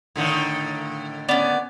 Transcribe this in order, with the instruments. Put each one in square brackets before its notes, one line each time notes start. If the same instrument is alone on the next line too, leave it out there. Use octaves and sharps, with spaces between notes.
[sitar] A2 D3 D#3
[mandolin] B3 C#4 [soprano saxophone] D5